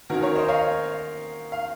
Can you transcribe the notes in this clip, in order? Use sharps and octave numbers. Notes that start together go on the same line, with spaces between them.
D#3 A#3 C#4 F#4 A#4
A#4 C#5
C5 D#5
C#5 F5
F5